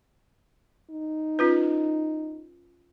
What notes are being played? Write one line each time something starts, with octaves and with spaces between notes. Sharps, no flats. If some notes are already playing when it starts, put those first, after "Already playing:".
D#4
C#4 F4 B4